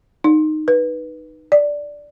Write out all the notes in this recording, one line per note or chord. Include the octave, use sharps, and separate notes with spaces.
D#4
B4
D5